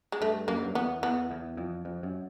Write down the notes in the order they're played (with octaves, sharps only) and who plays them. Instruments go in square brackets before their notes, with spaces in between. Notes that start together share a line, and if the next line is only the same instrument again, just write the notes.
[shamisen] G#3
[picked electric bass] G2 [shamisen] A3
[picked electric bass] F#2 [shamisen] A#3
[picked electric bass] G2
F#2
[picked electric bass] E2 [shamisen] B3
[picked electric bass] E2 [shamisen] B3
[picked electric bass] E2
F2
F2
F#2